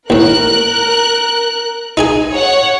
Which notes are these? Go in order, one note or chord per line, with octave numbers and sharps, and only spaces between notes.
D#2 A2 A#4 F#6
D#4 G#4 G#5
C#5 F#5